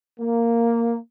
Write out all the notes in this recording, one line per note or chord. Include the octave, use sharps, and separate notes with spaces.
A#3